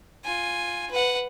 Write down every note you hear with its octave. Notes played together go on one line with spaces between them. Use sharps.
F4 G#5
B4 F#5